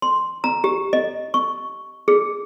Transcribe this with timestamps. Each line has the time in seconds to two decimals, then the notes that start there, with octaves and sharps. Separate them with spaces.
0.02 C6
0.44 A#5
0.64 G4
0.93 D#5
1.34 C#6
2.08 G#4